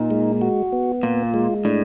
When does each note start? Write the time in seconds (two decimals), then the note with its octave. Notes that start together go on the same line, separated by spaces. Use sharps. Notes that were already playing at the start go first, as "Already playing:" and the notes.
Already playing: A#2 D#4
0.11 G#3
0.41 F#4
0.72 B3
1.03 A#2 F4
1.34 G#3
1.65 A2 D4